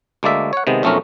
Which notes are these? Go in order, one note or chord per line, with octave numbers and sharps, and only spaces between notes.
D2 G#3 A#3 D5 E5
C#5 F#5
C3 D#3 G#3 B3
B1 F2 A3 C4 C#4 A#4